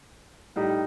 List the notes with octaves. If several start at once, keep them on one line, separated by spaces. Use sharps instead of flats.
A2 G3 D#4